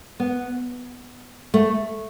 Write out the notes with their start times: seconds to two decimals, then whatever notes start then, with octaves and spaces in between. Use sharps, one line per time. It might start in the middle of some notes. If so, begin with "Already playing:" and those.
0.20 B3
1.54 A3